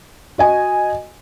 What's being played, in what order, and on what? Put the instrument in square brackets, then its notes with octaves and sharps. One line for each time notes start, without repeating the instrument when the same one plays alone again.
[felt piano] F#4 D#5 G#5